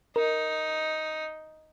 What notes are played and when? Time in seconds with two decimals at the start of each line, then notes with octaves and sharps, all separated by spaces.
0.16 D#4 A#4